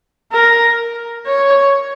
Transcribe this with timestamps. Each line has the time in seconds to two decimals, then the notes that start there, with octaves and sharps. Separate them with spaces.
0.32 A#4
1.27 C#5